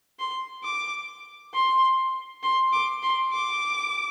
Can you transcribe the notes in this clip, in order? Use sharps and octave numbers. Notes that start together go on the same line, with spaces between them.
C6
D6
C6
C6
D6
C6
D6